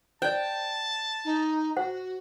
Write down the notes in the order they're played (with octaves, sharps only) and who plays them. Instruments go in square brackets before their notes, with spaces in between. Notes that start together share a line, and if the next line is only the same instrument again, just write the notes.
[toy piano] C5 D5 [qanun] G5 [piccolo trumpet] A5
[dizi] D#4
[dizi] F#4 [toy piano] C5 F#5